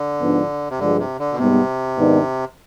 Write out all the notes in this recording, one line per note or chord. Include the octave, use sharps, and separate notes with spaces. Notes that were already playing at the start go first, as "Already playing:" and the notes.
Already playing: D3
G#2 F3 B3 D4
C3
G2 D3 F3 G#3
C3
D3
B2
G#2 C3 G3 B3
G#2 D#3 B3 D4